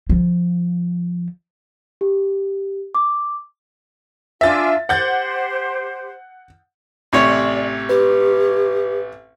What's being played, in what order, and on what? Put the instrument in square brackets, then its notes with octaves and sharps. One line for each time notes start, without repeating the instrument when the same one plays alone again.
[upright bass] F3
[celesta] G4
D6
[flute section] D4 F4 G#5 [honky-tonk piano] E5 A6
[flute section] G4 C5 [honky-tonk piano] F#5 G6 A6
[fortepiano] A1 C3 C#5 [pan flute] D5
[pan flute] G4 [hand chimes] B4